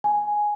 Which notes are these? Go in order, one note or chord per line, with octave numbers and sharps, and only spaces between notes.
G#5